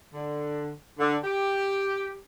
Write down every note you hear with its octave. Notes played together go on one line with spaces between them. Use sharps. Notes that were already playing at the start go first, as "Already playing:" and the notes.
D3
D3
G4